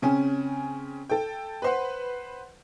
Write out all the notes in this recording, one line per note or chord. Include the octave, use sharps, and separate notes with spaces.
C#3 C4 C#4 G#5
A4 G5
B4 C5 F#5